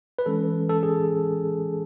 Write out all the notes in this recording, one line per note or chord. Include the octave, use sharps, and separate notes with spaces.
B4
E3 G#3 C#4 A4
A4
G#4